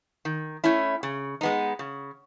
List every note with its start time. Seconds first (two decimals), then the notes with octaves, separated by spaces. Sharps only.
0.25 D#3
0.64 A3 C#4 E4
1.03 C#3
1.41 G#3 B3 D#4
1.79 C#3